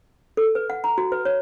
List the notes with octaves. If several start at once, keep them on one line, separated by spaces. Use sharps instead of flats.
A4
B4
F#5
A#5
F#4
B4
C#5